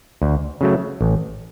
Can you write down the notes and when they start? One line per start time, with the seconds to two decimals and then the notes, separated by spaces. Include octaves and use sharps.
0.22 D2
0.61 C#3 F#3 A3
1.01 A1